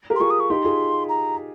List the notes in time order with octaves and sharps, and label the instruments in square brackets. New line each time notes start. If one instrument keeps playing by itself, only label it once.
[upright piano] G4 A#4
[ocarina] C6
[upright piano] F4 G#4 [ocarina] C#6
[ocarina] D#6
C#6
[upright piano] D#4 G4 [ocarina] C6
[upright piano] F4 G#4
[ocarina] A#5